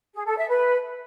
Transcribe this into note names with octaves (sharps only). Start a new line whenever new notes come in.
G#4
A4
E5
B4